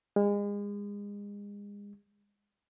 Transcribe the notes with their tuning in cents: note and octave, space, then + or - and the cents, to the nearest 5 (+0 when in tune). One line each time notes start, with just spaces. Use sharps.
G#3 -35